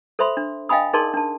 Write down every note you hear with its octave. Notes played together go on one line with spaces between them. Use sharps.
A4 C5 E5 B5 C6
D4
D#5 F5 G5 G#5 B5 D#6
D#4 G#4 A#4 D5 A5 C6
D4 A5